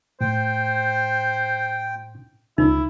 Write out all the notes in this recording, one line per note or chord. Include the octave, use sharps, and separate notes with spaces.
A2 C5 G5
C#2 D#4 E4